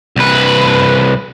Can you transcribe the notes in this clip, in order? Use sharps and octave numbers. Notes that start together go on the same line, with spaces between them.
C2 B4